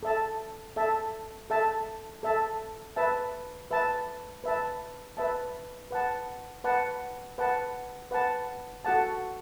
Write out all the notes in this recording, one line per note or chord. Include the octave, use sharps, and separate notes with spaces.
A4 E5 A5
A4 E5 A5
A4 E5 A5
A4 E5 A5
B4 E5 A5
B4 E5 A5
B4 E5 A5
B4 E5 A5
B4 F#5 A5
B4 F#5 A5
B4 F#5 A5
B4 F#5 A5
F#4 A4 F#5 A5